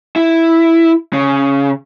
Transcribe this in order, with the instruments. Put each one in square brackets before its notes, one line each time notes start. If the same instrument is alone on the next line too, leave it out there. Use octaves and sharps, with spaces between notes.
[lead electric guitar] E4
C#3